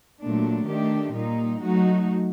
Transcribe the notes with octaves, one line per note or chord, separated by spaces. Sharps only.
A#2 F#3 A3 D4
D#3 A3 D4 G4
A#2 G3 A#3 D#4
F#3 A3 D#4 F#4